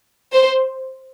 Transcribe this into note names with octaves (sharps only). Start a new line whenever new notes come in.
C5